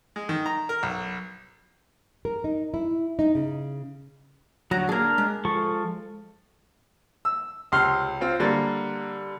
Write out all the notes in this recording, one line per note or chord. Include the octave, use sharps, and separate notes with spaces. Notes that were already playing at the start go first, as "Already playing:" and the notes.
G#3
D#3
A#5
A#4
B1
A#4
D#4
E4
D#4
C#3
D2 F#3 A#5
A#3 D4 G#4 A#4
G#3
F3 A4 C#6
E6
C#2 C3 C6 F6
C4 F4
D3 G3 A#3 A6